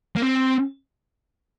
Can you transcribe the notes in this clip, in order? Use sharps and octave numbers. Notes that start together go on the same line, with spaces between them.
A#3
C4